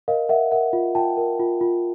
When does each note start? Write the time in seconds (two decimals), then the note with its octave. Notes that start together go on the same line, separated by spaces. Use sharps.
0.08 A#4 D#5 F5
0.29 A#4 E5 F#5
0.52 A#4 E5 F#5
0.73 F4
0.95 F4 G5 A5
1.17 A#4
1.39 F4
1.61 F4